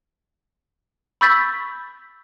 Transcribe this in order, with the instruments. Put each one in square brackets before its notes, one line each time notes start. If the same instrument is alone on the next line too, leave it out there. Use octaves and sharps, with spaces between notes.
[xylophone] B5 C#6 E6 G6 A6 B6